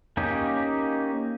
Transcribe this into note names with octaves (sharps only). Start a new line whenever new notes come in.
A#3 C#4 D#4 G4